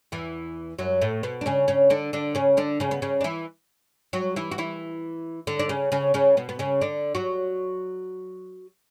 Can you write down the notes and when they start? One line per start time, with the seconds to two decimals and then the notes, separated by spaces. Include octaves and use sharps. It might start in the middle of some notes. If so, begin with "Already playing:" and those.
0.12 E2 E3
0.79 F#2 F#3
1.01 A2 A3
1.23 B2 B3
1.41 D4
1.46 C#3 C#4
1.68 C#3 C#4
1.90 D3 D4
2.13 D3 D4
2.35 C#3 C#4
2.57 D3 D4
2.80 C#3 C#4
2.91 B3
3.02 C#3 C#4
3.21 D4
3.24 E3 E4
4.13 F#3 F#4
4.36 E3 E4
4.52 F#4
4.58 E3 E4
5.47 D3 D4
5.59 D4
5.69 C#3 C#4
5.92 C#3 C#4
6.14 C#3 C#4
6.37 B2 B3
6.49 B3
6.59 C#3 C#4
6.81 D3 D4
7.15 F#3 F#4